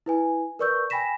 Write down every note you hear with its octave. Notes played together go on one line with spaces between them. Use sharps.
E4 B4 G#5
A#4 B4 D5 C#6 E6 G6
G5 G#5 B5 A#6 B6 E7